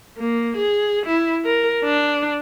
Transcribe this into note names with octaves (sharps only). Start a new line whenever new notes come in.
A#3
G#4
E4
A#4
D4